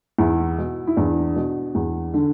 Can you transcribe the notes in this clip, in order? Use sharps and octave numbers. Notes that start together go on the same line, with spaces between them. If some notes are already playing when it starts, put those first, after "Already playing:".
E2 E4
B2
E4
E2 D4
B2
E2
D3